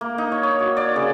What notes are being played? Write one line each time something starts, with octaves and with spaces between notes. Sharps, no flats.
A#3
D#4
C#5
C#5
F#4
D5
C#3